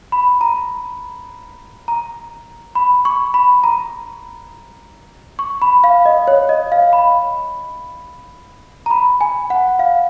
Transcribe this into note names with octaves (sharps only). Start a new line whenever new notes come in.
B5
A#5
A#5
B5
C#6
B5
A#5
C#6
B5
F5
D#5
C#5
D#5
F5
B5
A#5
B5
G#5
F#5
F5